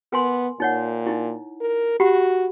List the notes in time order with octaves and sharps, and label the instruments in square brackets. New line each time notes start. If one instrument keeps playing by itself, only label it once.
[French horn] B3 [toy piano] A#4 G#5 C6
[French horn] A#2 [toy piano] D#4 C#5 F#5
[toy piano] D#4 E4
[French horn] A#4
[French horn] F#4 [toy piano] G4 F#5 B5